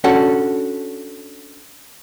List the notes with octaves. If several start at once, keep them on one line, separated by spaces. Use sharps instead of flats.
C#4 D4 F#4 A4